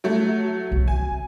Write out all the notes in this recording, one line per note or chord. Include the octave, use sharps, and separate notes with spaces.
F#3 A3
B1
C4 G#5